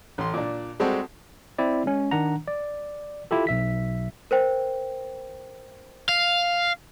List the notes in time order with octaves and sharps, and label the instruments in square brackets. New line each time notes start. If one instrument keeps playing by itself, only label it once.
[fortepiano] A1 C6
A#2 D4
G3 G#3 C4 F#4 G4 A4
[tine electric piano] C4 E4 D5
G#3 C#4
D#3 D4 F#5 A#5
D5
E4 F4 G4 A4
B1 E5 B6
[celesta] A#4 C5 G5
[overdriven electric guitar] F5